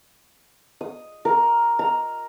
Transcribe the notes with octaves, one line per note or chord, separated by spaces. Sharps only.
D#6
A#4
A#5